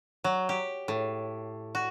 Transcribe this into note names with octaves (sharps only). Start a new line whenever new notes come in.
F#3
G4
A2
F#4